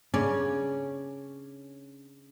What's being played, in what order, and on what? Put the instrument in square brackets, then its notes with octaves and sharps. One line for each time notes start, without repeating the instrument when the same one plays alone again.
[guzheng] C#3 D4 D5 [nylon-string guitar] C#4